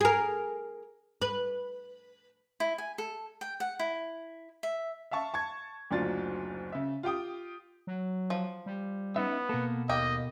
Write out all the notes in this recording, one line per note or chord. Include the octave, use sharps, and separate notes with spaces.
G#4 A#4
B4
E4
G#5
A4
G5
F#5
E4
E5
E5 F5 A5 C#6
A5 C#6 G#6
F#1 D2 F#3 D4 F4 A6
C#3 E5
F4 G4 G5 D#6
F#3
F3
G3
B3 C#4 D#4 E5
B2 A#3 A4
D#2 A#3 G4 D#5